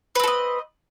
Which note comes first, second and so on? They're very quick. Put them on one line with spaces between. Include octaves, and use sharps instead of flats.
B4 C4 A4 D#5